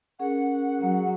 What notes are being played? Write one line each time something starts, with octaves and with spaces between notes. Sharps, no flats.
C#4 G#4 A#4 F#5
F#3